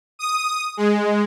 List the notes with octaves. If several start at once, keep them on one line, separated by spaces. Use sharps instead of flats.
D#6
G#3